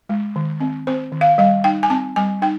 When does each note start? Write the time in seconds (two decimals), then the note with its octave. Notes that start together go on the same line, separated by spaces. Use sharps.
0.09 G#3
0.36 D#3
0.60 C4
0.87 C4 C5
1.12 D#3
1.21 F5
1.38 G3 F5
1.64 D#4 G5
1.83 G#5
1.90 C4 A5
2.16 G3 G#5
2.42 D#4 G5